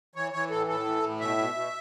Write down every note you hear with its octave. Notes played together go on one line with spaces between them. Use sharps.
E3 C#5
E3 C#5
A2 A4
A2 A4
E3
A2
B2 E5
B2
B2